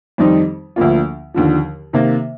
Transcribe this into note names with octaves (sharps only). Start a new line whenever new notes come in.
F2 D#3 G3 C4 D#4
D2 D3 F3 A#3 F4
D#2 D3 F3
C3 D#3 A#3